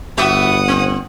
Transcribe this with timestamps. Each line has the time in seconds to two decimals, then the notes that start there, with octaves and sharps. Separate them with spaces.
0.17 G1 B3 F#4 E5 F#5 D#6
0.68 C4